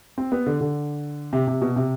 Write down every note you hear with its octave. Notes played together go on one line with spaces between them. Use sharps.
C4
B3
D3
D3
C3
C3
B2
C3